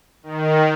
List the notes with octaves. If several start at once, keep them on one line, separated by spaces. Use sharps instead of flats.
D#3